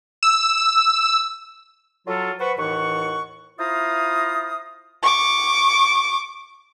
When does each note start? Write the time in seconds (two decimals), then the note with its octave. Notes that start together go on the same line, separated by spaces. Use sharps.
0.23 E6
2.08 F#3 F4 A4
2.40 B4 C5 F#5 B5 C#6
2.58 D#2 A2 E3 F#5 C#6
3.59 E4 F4 C5 F5 A#5 D#6
5.03 C#6 D6